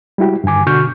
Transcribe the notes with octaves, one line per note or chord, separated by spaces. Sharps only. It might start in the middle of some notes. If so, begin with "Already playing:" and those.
G3 G#3 E4 F#4 G4
G2 D3 D#3 G#5 D6
B2 D3 F#4 C#6 F6 G6